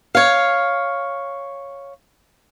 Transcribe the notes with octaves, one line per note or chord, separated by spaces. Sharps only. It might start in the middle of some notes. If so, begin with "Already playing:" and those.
C#5 F5